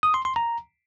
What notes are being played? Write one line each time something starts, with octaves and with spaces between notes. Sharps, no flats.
D#6
C6
C6
A#5